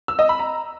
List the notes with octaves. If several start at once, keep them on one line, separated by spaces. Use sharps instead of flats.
E6
D#5
B5
A#5